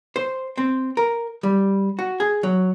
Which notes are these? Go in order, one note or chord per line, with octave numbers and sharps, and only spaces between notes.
C5
C4
A#4
G3
F#4
G#4
F#3